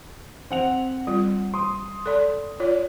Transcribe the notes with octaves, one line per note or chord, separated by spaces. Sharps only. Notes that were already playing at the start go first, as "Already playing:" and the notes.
C4 F#5 F7
G3 F4
C6 D#6
A4 D5
F4 C#5 D5